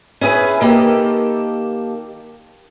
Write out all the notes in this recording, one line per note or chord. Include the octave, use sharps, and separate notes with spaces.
C#4 E4 G#4 B4
D#3 A#3 G4 A4